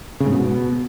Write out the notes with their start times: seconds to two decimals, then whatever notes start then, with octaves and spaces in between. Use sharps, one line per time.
0.20 C#3
0.27 G#2
0.33 B2